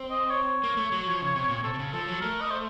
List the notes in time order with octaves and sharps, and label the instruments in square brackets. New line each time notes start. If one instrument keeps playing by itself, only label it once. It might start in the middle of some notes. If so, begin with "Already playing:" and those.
Already playing: [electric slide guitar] C4
[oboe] D#5
C#5
[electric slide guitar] A#3
A3
F#3
F3
C#3
C3
A#2
[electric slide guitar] C3 [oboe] A4
[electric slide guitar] C3
C#3
[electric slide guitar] F3 [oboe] A4
[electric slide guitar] F#3
[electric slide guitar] A3 [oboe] A#4
[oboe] D#5
C5